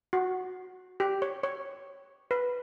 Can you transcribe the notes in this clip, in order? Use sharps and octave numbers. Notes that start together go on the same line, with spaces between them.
F#4
G4
C#5
C#5
B4